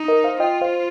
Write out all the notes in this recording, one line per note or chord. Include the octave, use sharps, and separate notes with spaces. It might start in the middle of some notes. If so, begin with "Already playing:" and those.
Already playing: D#4
A#4 D#5
C5 F5
F4 D#5 G5
C5 F5